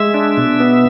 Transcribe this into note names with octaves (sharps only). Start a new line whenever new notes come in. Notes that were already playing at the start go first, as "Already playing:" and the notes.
Already playing: G#3 E5
D4
B2
B3